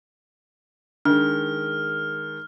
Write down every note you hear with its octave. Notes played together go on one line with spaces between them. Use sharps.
D#3 G#3 D4 F6